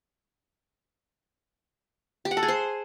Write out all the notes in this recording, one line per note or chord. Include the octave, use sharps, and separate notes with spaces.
G4
F#5
A4
G#4
C5